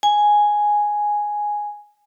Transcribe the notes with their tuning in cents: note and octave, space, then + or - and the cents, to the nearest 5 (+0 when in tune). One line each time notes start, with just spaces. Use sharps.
G#5 +0